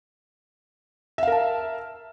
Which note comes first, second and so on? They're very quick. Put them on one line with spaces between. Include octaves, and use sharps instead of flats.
E5 F5 A#4 A5